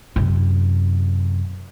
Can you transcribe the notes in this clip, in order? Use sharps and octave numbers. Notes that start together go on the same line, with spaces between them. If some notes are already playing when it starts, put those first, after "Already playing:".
F#2 C3